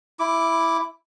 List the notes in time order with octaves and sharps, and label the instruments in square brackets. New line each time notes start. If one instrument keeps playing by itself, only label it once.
[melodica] E4 D6